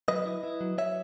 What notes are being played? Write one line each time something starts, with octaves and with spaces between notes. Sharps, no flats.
F#3 B4 D#5
E4
E4
F#3
F#3 C#5 E5